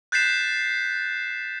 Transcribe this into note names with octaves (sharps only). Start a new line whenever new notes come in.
F#6 G6 A6 B6 C7 E7